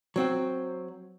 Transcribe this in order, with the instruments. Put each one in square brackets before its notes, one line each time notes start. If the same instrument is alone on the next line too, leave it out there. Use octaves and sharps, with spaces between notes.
[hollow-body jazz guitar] F#3 C4 F#4